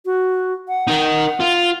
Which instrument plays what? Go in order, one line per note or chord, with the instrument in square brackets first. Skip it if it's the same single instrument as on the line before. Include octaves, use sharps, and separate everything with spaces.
[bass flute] F#4
F#5
[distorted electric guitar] D#4 A#4
F4